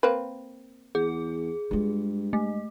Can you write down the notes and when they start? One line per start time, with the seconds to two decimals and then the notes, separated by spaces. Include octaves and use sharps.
0.03 A#3 C4 B4
0.95 E2 G#4
1.71 G2 G#3 F4
2.33 A3